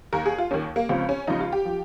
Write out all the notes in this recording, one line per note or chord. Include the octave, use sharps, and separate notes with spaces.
D#2 D#3 A#4
G#4
F4
D#2 D#3 C#4
A#3
C#2 C#3 F3 C4
C#4
C#2 C#3 F3 D#4
F4
G4
F3